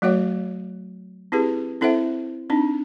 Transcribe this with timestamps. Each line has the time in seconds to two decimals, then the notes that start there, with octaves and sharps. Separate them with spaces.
0.02 F#3 A3 F#4 C#5 F#5
1.32 C4 E4 G4 G#4 B4
1.81 C4 E4 A4 C5 E5 F#5
2.50 C4 D4 D#4